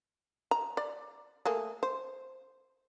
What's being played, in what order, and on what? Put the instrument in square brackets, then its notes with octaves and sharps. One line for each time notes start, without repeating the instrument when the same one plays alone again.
[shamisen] A#5
D5
A3 A#3 G#4
C5